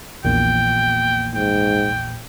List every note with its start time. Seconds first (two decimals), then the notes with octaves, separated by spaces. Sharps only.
0.25 A#1 E2 A#2 G5
1.35 G#2 G5